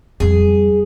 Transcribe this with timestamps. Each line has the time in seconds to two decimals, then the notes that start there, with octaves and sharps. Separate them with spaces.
0.20 F2 G3 G#4